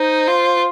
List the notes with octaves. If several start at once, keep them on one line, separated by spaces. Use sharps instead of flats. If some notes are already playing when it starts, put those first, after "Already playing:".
Already playing: D#4 C5
F4